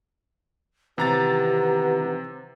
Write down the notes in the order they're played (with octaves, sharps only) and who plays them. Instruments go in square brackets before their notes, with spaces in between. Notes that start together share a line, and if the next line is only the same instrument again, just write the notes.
[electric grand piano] C3 A#5 A6 [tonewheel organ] D#3 E3 [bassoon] B3 [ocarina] G4